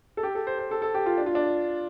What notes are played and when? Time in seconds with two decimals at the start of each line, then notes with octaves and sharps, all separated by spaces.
0.17 A4
0.23 G4
0.35 A4
0.47 C5
0.59 C5
0.71 A4
0.82 A4
0.94 G4
1.06 F4
1.18 D4
1.26 F4
1.35 D4